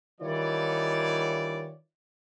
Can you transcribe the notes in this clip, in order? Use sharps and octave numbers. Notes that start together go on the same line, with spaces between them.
D#3 E3 G3 F4 C#5 D5